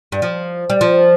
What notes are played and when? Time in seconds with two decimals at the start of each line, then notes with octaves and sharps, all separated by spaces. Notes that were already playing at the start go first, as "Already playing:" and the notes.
0.12 G2
0.22 F3
0.70 G3
0.81 F3